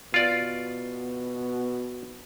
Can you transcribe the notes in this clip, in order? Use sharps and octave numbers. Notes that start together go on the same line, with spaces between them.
B2 F4 D5